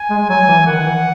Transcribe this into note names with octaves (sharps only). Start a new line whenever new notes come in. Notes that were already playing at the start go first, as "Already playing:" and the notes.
Already playing: G#5
G#3
F#3 G#5
E3
D#3 F#5
E3